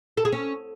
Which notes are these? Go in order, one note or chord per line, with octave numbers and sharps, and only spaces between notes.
A4
G#4
C#4